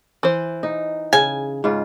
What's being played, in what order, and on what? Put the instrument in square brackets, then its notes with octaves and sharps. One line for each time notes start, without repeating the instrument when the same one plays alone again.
[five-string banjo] E3 C5
[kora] D#4
[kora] C#3 [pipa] G#5
[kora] G#2 C#3 F4